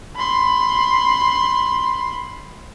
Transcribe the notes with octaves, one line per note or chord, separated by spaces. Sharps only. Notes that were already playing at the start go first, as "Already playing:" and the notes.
B5 C6